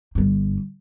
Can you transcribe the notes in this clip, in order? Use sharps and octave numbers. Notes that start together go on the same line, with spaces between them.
G1 G2